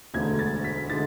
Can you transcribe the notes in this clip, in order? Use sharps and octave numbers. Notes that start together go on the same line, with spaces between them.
E1 D2 D3 G#3 G#6
A6
B6
D3 G#3 A6